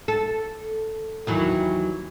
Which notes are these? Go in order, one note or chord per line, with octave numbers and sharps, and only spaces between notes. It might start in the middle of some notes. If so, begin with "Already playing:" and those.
A4
D#2 E3 F#3